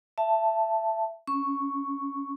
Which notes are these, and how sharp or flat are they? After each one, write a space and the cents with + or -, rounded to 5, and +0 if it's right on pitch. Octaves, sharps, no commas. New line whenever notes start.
E5 +20 A5 +0
C#4 +0 C#6 +0